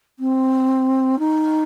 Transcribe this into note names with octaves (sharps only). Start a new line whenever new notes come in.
C4
D#4